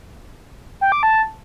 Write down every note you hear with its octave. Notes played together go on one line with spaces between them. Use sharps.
G5
D6
A5